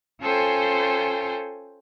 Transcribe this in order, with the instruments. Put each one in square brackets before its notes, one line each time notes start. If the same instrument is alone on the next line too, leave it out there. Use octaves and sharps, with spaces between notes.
[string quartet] C#4 F4 A4 C5 G5 G#5